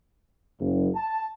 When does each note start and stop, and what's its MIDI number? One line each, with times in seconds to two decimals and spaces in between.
0.60 0.88 30
0.95 1.26 81